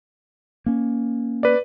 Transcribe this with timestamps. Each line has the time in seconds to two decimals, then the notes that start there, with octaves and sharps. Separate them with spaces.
0.66 A#3 C#4
1.43 B4 D5